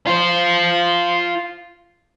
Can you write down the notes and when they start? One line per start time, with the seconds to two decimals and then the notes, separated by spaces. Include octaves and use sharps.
0.07 F4 C5